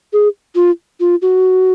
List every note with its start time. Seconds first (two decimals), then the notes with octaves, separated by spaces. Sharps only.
0.13 G#4
0.55 F4
1.00 F4
1.22 F#4